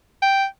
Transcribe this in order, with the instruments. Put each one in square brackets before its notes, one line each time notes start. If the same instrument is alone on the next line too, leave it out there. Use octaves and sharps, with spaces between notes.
[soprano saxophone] G5